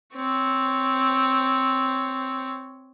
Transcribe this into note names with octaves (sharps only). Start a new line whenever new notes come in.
C4 C#5